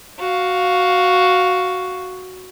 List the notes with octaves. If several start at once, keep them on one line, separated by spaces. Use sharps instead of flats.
F#4 F5